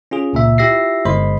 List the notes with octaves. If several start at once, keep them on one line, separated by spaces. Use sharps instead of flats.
C#4 F4 G#4
C#2 A#2 E5
E4 F4 G4 E5 A#6 C7
G1 G#3 C5 D#5 B5 C6